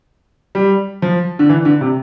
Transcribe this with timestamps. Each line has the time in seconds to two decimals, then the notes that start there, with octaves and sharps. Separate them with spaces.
0.55 G3
1.02 F3
1.39 D3
1.50 E3
1.65 D3
1.81 C3